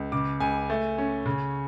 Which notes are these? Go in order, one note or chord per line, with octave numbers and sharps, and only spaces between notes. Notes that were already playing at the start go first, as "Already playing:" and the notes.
Already playing: C#2
C#3 D6
C#2 G#5
A3
C#4
C#3